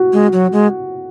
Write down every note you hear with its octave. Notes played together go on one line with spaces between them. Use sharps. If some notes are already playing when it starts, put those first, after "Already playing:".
Already playing: F#4
G#3
F#3
G#3